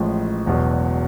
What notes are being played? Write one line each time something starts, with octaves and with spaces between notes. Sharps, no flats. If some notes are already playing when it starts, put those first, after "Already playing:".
Already playing: A1 A2 F3 G#3
E1 E2 B2 F#3